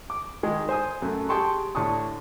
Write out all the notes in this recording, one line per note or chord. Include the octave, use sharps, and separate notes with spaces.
D6
D#3 G#3 G#4
C5 G#5 D#6
F#2 A3
G4 G#4 G5 A5 C6 C#6
A2 D3 D4 A5 C#6 D#6